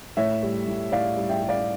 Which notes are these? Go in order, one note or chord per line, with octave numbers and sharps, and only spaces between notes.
A2 C#5 E5
G3
A2
A2 D5 F5
G3
E5 G5
G3
D5 F5